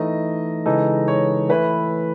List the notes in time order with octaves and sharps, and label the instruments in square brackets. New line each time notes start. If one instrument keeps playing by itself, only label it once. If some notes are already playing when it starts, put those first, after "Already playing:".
Already playing: [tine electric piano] E3 A3 D#4 [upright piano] D#5
[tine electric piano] C#3 E3 G#3 D#4 A4
[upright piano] C#5
[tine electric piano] E3 A3 E4 [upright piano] B4